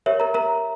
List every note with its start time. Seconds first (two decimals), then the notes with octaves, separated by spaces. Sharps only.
0.06 G4 A#4 C#5 E5
0.20 A#4 A#5
0.34 A#4 A#5